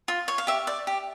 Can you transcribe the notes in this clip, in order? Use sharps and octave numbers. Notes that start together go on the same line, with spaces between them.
F4
C#5
F5
G4 E5
D5
G4